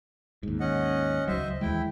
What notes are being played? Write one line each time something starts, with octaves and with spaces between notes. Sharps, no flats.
D#2 G#2
C#4 D#5 F#5
C#2 F#3 C5 D#5 E5
D#2 E3 G#3 E4 G5